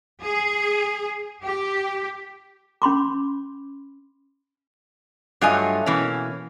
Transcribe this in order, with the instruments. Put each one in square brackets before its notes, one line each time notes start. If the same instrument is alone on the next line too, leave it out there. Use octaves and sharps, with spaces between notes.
[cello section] G#4
G4
[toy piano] C#4 B5 C6 D6
[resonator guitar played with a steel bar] G2 F#3 A3 F4 D#5 G#5
B2 E3 A#3 C#4